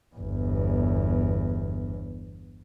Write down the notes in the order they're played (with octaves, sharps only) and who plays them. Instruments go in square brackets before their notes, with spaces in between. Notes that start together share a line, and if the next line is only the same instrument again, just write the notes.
[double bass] G1 E2